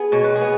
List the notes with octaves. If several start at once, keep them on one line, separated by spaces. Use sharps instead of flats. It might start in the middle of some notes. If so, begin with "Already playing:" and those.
Already playing: B3 G#4
B2 C#5
B4
G#4
B3